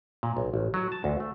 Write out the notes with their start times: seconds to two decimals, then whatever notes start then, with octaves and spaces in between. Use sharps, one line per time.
0.23 A#2
0.37 B1
0.54 A1
0.74 F#3
0.92 A5
1.04 D2
1.20 A3